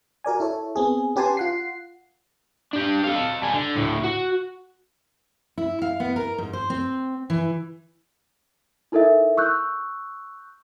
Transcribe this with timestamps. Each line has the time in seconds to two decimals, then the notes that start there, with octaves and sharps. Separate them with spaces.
0.24 F#4 A#4 D5 G#5
0.40 E4 A4 C#5
0.76 B3 C4 G#4
1.16 C#4 G4 B4 G#5 A5 C6
1.37 F4 F#5 C7
2.73 D4 G4
3.04 A4 F5
3.42 G3 G#5
3.54 D3
3.76 D2 A2
4.03 F#4
5.58 E4
5.82 F5
6.00 B3
6.16 A#4
6.38 G#2
6.53 C5
6.70 C4
7.30 E3
8.92 D#4 E4 A4 A#4 E5
9.37 C#6 E6 F#6 G6